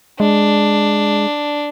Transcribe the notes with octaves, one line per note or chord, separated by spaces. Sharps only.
G#3 D4